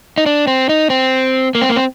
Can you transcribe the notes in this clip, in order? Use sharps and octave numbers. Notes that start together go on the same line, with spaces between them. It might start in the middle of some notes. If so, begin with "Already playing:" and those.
D#4
D4
C4
D#4
C4
A#3
C4
A#3
C4